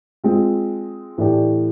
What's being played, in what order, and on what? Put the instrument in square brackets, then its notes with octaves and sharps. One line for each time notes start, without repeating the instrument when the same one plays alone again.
[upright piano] G#3 C4 F4
A2 E3 A3 D4 G4